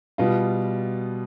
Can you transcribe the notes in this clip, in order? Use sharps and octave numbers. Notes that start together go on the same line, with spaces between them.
B2 G3 B3 F4